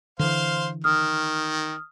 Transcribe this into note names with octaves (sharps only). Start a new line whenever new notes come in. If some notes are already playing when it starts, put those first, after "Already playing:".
D3 E3 C5 F5
D#3 D#6 F6